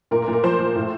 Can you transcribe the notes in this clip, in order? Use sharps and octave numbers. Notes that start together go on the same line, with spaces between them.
A#2 A#4
A#4
A#2
A#4
F3 C5
F3
A2